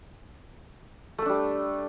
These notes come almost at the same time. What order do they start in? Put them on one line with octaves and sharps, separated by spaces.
A3 A4 D4 G3